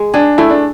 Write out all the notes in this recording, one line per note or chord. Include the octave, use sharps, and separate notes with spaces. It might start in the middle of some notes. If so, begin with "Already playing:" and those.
Already playing: G#3
D4 G#4
A3 E4
D4